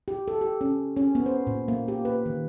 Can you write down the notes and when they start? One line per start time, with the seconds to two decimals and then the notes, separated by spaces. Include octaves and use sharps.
0.08 G4
0.28 A4
0.41 G4
0.61 C#4
0.96 C#4
1.15 B3
1.26 C5
1.47 A#2
1.68 A#3
1.88 G4
2.05 B4
2.26 D#3